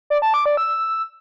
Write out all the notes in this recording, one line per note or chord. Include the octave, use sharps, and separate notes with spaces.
D5
A5
D6
D5
E6